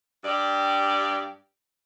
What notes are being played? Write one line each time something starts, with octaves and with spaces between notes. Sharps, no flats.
G2 G4 D5